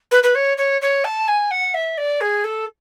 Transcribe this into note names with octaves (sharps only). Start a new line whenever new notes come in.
B4
B4
C#5
C#5
C#5
A5
G#5
F#5
E5
D5
G#4
A4